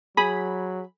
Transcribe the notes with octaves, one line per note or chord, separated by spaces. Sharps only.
F#3 G#4 B5